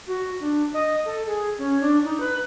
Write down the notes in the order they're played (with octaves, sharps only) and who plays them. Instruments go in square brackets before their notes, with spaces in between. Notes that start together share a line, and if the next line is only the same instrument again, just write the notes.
[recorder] F#4
D4
D#5
A4
G#4
C#4
D4
D#4
B4